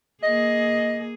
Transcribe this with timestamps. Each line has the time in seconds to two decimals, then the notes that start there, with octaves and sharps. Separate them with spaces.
0.23 A#3 G#4 D#5